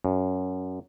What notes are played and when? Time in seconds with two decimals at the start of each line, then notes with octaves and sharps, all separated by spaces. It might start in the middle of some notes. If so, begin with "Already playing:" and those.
0.05 F#2